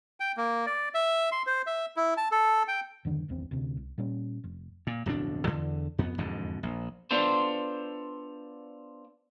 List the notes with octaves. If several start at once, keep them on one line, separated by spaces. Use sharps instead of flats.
G5
A#3
D5
E5
C6
C5
E5
E4
A5
A4
G5
E2 G2 D3 D#3
D1 G#1 E2 C4
D2 C3
C2
A#2 G3 C#4
F1
A#2
D1 F2 B2 D4
E2 D3
F2 B3
E1 F2 G#2 D3
A#1
B3 D4 F4 A4 C5